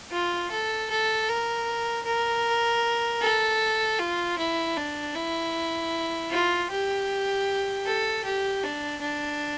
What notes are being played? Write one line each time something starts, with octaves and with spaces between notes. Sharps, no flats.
F4
A4
A4
A#4
A#4
A4
F4
E4
D4
E4
F4
G4
A4
G4
D4
D4